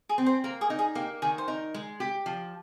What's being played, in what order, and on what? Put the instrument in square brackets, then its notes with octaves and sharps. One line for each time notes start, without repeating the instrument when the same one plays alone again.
[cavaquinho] G#4
[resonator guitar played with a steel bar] C4
[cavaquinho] C5
[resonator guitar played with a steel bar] A#3 [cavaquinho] A#4
[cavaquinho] G#4
[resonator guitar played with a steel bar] D#4
[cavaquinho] G#4
[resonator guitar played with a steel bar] A#3 [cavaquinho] G4
[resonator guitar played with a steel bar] D#3 [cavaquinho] G#4
[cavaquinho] C5
[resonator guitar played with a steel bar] D#4 [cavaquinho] A#4
[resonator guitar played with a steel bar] G#3
G4
F3